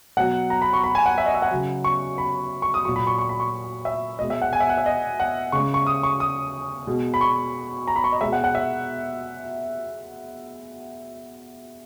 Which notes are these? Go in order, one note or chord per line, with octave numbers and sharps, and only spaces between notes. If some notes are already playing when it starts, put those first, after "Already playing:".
B2 F#3 F#5
A#5
B5
C#6
B5
G#5
F#5
E5
D#5
E5
F#5
C#3 F#3
C#6
B5
C#6
D#6
A#2 F#3 C#6
B5
C#6
C#6
B5
C#6
E5
B2 G#3 D#5
E5
F#5
G#5
E5
F#5
E5
D#5
F#5
C#3 G#3 C#6
C#6
D#6
C#6
D#6
B2 G#3
B5
C#6
A#5
B5
C#6
D#5
B2 G#3 E5
F#5
F#5
E5